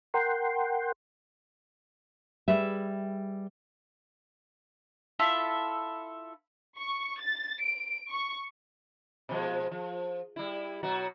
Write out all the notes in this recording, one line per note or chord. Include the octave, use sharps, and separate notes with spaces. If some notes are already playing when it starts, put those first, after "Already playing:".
A#4 F#5 G5 C6
G3 G#4 B4 E5
E4 F4 A4 E5
C#6
A6
D7
C#6
B2 F3 G#3
F3
G3 E4
B2 F#3 F#4